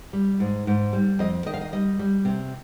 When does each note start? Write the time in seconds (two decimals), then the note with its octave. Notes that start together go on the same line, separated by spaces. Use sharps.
0.13 G3
0.40 G#2
0.67 G#2
0.93 G3
1.19 F2 D#5
1.46 D#3 D#5
1.54 F5
1.61 D#5
1.73 G3 D#5
1.99 G3
2.25 C3